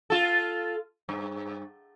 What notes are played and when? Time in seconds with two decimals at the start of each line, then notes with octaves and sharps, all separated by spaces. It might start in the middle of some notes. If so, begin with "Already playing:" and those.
0.10 F4 A4
1.09 G2